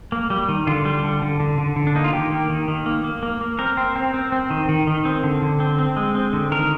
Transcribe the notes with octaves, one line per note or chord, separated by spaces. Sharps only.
A#3
G3
D#3
D3 F4
G3
D3
D3
D3
D3
D3
D4
A#3 D#4
F4
D#3 G4
A#3
D#3
D#3
A#3
A#3
A#3
A#3
C4 A#4
C4
C4
C4
C4
D#3
D#3
D#3
C4
D3
D3
C4
C4
G#3
C4
D3
D#3 A#4